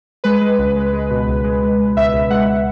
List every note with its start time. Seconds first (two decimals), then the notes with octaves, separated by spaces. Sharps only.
0.24 G#3 B4
0.41 G#3
0.59 C#2
0.76 G#3
0.93 G#3
1.10 B2
1.28 C#2
1.44 G#3
1.62 G#3
1.79 G#3
1.97 C#2 E5
2.13 C#2
2.30 G#3 F#5